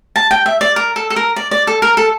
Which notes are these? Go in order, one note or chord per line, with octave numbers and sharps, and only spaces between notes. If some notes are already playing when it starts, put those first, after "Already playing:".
A5
G5
E5
D5
A#4
A4
A4
A#4
D5
D5
A4
A#4
A4